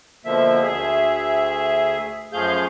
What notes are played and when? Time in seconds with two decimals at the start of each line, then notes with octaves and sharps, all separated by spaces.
0.25 B2 D3 F3 A#3 E5
0.63 D2 G#4 E5
2.33 F#2 F3 A3 G#4 F5 G6